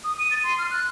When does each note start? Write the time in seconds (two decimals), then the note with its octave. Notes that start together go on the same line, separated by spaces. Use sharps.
0.04 D#6
0.19 D#7
0.31 A6
0.43 C6
0.58 F6
0.71 F#6